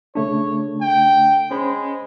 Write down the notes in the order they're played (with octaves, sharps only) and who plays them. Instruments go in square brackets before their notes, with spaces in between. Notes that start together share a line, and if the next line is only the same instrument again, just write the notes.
[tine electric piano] C#3 A3 D4 [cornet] C#5
[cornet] G5
[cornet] G#3 [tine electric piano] C#4 C5 B5